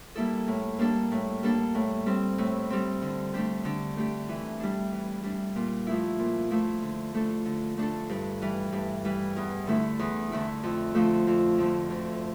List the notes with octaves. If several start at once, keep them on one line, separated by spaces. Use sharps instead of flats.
G3 A#3 E4 A4
A2
G3 A#3 D4 A4
A2
G3 A#3 D4 A4
A2
G3 C4
A2
G3 C4
D3
A3 D4 G4
D3
A3 D4 G4
E3
G3 D4
E3
G3 D4
A#2
F3 A3 E4
A#2
F3 A3 E4
D3
A3 D4 A4
D3
A3 D4 A4
G2
E3 G3
G2
E3 G3
E2
D3 A3 E4
E2
D3 A3 E4
F2
D3 F3 A3
F2
D3 F3 A3
D2